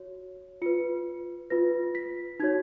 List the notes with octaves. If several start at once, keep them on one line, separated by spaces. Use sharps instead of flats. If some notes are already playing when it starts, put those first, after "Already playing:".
Already playing: F#4 C#5
F4 B4 C#7
F4 B4 A#6
B6
D#4 F#4 C#5 G#6